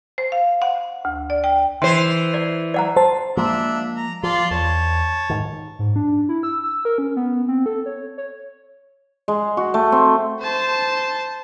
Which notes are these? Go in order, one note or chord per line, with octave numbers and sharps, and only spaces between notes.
C5
F5
F#5
D2
D5
G5
E3 C5 C6
D5
D5 F#5 A#5
C5 A5
F3 G#3 A#3 D4 E5
A#5
F3 F4 D5 C6
E2 C#5 A5
G#2 D#3
G#2
D4
E4
E6
E6
A#4
C#4
B3
C4
A4
C#5
C#5
G#3
F#4
A3
C4
C5 A5